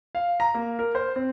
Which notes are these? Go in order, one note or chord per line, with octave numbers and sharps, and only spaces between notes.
F5
A#5
A#3
A#4
C5
C4